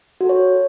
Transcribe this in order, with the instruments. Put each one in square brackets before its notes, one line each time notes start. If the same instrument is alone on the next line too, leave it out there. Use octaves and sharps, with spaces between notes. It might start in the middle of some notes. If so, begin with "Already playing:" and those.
[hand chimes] F#4
A4
C#5